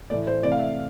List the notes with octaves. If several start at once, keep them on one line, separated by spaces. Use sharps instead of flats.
A2 E3 A3 D5
C5
C3 E3 A3 D5
F5
E5